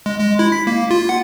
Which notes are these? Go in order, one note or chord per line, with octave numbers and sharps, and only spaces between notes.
G#3
G#3
E4
B6
A#3
F4
F#5